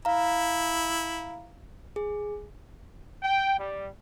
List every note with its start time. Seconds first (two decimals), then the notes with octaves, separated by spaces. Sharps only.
0.05 E4 F5 A#5
1.96 G#4
3.23 G5
3.59 G3